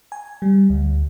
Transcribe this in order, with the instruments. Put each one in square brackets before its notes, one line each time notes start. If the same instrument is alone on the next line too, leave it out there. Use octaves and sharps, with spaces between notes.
[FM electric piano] G#5
G3
D2